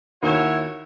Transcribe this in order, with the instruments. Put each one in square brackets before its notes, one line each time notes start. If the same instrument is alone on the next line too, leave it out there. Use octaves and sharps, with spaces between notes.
[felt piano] D#2 [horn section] E4 F#4 C#5